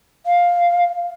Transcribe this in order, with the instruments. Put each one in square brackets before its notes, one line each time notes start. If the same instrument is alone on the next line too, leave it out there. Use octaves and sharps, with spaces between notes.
[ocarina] F5